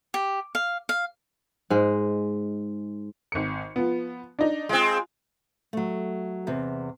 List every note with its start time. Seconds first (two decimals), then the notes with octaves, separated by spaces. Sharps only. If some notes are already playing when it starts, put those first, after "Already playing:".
0.14 G4
0.55 F5
0.89 F5
1.70 G#2 G#3
3.32 G#1 C#7
3.76 F3 B3
4.39 D4 D#4
4.69 G#3 C4 F4
5.73 F#3 A3
6.47 E2 C3